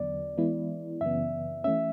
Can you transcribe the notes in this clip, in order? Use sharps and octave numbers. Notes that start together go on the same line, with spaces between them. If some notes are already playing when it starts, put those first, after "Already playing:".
Already playing: E2 D3 F#3 B3 D5
E3 G#3 B3 E4
F#2 C#3 E3 B3 E5
E3 A3 C#4 E5